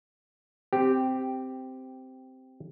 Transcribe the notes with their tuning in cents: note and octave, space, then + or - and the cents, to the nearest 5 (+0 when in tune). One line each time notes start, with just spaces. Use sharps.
C4 -10 G4 +0